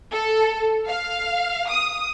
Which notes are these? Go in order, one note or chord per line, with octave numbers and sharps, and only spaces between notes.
A4
F5
D#6